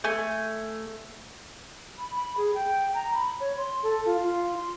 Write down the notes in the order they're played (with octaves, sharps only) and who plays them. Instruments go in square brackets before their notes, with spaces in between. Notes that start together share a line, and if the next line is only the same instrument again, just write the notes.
[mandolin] A3 G#5
[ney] B5
B5
G#4
G5
A#5
B5
C#5
C6
A4
F4
F4
C6